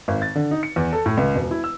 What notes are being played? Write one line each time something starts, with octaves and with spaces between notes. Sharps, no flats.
G#1
A6
D3
D#4
C#7
E2
A4
A2
C#2
E1
E4
E6